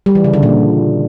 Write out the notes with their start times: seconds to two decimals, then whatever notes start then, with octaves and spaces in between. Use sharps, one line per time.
0.06 G3
0.15 E3
0.24 C#3
0.34 D3
0.43 A#2